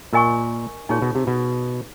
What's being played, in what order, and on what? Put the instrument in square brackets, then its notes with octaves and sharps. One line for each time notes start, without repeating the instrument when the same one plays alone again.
[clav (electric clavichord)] A#2 [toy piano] A#4 D#5 G#5 C#6
[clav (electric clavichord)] A#2 [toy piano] D#4 G#4 C#5
[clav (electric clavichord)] B2
C3
B2